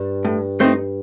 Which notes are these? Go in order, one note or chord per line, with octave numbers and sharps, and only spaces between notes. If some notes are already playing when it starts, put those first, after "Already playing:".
Already playing: G2
A2
A3 C4 D#4